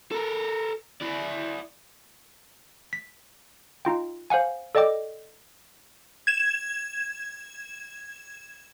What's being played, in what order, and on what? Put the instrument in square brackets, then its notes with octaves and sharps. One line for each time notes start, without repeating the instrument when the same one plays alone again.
[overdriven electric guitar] A4 A#4
E4 D5
[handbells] B6
D#4 F4 G5
C5 F5 F#5 G#5
A4 D5 D#5 G5 D6
[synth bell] G#6 E7